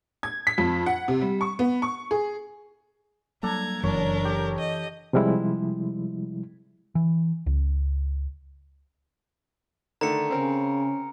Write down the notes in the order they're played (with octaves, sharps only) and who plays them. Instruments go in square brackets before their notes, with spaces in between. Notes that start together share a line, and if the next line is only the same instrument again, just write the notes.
[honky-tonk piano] G#6
B6
F2
F#5
C3
G3
C#6
B3
C#6
G#4
[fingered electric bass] F#3 G3 A#3 [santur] D4 A4 [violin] A#5 G#6
[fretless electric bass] F#1 F#2 [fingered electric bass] E3 [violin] D4 A#4 [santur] C#5
[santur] G4
[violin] D#5
[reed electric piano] C3 F3 G3 G#3 E4
[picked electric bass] E3
C#2
[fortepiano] D3 D#3 A3 [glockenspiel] A#5 C#7
[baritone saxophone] C#3 [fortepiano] C4 A#4 [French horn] C#4